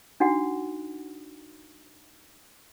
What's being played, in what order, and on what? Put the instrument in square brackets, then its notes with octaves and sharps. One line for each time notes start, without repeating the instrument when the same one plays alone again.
[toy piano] D4 D#4 F#4 F#5